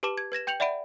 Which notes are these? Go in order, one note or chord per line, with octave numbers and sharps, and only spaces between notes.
G4 B4 A5 D6 E7
G#6
B4 G#6 A#6 E7
G5 G6 C#7 F7 F#7
D5 E5 F#5 B5 D7 D#7